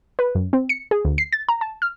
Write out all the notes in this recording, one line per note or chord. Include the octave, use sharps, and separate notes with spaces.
B4
F#2
C4
C#7
G#4
D2
C7
A6
A#5
A5
F6